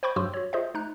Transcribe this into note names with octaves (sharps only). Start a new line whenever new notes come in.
C5 G5 B5 C#6 G6
G2 F#3 F#4 C6 D6 E6
F#4 C#5
F4 G#4 C5 D#5 E5
A3 D#4 A#5 F#6